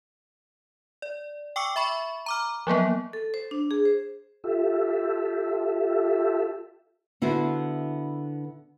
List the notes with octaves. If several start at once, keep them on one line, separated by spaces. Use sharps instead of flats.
D5
G5 C#6 D6 E6 C#7
E5 B5 C#6
A#5 D6 F6
F3 F#3 A#3 B3
A4
C5
D4
G#4
C5
F4 G4 A4 E5
D3 B3 E4 F#4 C5